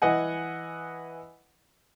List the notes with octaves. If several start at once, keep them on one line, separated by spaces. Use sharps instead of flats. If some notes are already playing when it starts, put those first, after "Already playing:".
E3 D#5 F#5 G#5